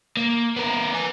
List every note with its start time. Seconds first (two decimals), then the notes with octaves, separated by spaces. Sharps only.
0.17 A#3
0.56 B3 A#4
0.94 B4 G#5